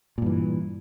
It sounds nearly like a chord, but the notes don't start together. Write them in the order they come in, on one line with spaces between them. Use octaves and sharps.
A#2 G2 E3